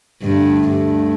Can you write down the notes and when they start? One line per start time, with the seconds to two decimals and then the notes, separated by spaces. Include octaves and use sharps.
0.22 D2 G2 D3 A3
0.68 G2